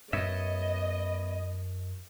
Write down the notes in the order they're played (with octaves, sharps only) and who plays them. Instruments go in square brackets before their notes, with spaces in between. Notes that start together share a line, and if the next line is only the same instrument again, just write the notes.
[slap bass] F#2 [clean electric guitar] B3 C#5 E5 [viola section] D#5